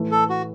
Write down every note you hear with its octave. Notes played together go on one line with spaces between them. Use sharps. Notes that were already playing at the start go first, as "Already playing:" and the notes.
Already playing: A2 E3 A3
A4
F#4